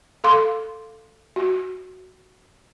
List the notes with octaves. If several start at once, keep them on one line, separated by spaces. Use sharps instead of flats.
A4 F5 C6 D6
F#4